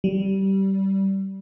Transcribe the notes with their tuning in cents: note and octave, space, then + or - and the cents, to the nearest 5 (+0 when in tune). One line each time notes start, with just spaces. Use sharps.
G3 -20